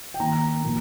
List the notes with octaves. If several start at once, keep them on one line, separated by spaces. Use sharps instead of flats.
G5
D#3 A#3 A#5
A#2 F3 A#3